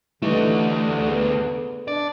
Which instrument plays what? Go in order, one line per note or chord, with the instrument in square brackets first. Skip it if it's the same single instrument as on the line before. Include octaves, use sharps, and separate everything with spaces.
[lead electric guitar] D2 A3 [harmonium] D3 [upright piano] E3 G3 D#4
[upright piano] B3 G#4
[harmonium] D4 [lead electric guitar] D5